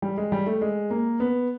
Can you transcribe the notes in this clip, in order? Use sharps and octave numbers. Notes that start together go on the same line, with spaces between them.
G3
G#3
G3
A3
G#3
A#3
B3